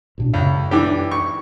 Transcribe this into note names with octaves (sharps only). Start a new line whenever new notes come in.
A1 B2 D4
C#2 F#2
E3 D4 G4
C#6